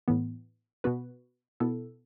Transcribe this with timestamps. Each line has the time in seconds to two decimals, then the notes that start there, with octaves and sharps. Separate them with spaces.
0.08 A2 E3 B3
0.84 B2 B3 F#4 B4
1.60 B2 B3 E4 A4